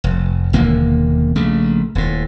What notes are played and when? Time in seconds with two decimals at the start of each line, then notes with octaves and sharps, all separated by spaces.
0.04 F1
0.53 E1 D#2 D3 A#3
1.36 A#1 C#3 A3
1.95 D#1 A2